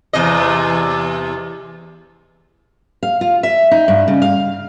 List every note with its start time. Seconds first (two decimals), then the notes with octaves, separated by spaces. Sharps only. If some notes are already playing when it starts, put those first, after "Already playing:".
0.13 E2 C3 D#5
3.03 F5
3.21 F4
3.43 E5
3.71 D#4
3.88 G2
4.08 C#3
4.22 F5